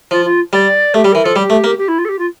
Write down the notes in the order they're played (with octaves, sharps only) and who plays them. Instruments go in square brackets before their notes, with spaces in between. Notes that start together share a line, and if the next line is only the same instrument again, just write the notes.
[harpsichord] F3 [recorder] F4
[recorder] F4
[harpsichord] G3 [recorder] D5
[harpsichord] A3 [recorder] G4
[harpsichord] G3
[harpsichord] E3 [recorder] A#4
[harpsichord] F3 [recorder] A4
[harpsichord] G3 [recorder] G4
[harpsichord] A3
A#3
[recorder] G4
E4
F4
A4
G4
F4